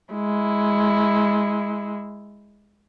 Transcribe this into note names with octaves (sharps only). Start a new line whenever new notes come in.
G#3 E4